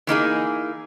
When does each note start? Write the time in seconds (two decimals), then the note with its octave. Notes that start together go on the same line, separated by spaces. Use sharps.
0.07 E3 A#3 D#4 G#4